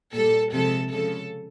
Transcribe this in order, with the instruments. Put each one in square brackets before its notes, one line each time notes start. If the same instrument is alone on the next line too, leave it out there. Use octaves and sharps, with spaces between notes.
[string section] A#2 G3 A4
C3 F3 G#3 A4
C#3 F3 G#3 A4